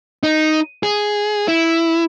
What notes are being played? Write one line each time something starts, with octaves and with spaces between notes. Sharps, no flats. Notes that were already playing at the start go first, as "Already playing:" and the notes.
D#4
G#4
E4